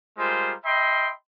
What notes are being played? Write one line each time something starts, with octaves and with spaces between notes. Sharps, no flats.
G3 G#3 F4 A#4 C5
D#5 E5 G5 B5 C6